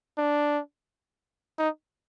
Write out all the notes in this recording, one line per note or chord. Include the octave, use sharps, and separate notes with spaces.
D4
D#4